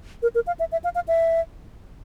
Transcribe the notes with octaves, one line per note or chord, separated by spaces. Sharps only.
A#4
A#4
F5
E5
E5
F5
F5
E5